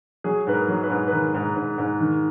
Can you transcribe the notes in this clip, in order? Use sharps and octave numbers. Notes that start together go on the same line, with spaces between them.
F#3 G#4
G#2 B4
A#4
F#3
B4
G#2
B4
D#3 A#4
G#2
G#2
G#2
D#3